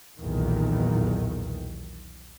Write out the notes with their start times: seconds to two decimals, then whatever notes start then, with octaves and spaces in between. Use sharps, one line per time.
0.19 B1 E2 A#2 D#3